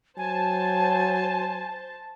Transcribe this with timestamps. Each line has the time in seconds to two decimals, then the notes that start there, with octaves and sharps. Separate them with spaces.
0.18 F#3 C5 G#5 A5